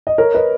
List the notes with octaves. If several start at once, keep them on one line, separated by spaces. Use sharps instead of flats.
D#5
A#4 C#5
B4 D#5